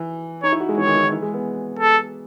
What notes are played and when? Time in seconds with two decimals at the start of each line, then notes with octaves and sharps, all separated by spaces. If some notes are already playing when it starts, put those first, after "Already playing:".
Already playing: E3
0.43 D#4 C#5
0.52 E4
0.60 F#4
0.69 G#3
0.78 E3 C#5
0.86 D#3
0.94 E3
1.03 D#3
1.12 E3
1.22 G#3
1.34 B3
1.79 A4